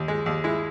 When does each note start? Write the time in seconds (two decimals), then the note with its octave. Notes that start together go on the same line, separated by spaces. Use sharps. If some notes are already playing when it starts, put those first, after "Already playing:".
Already playing: D#2
0.08 G#3
0.26 D#2
0.44 G#3 E4